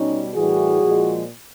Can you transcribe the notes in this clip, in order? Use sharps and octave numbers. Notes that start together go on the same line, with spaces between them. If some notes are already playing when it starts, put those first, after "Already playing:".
Already playing: B2 G3 C#4 D#4
A2 E3 G3 F#4 G#4
A#2 F3 G#3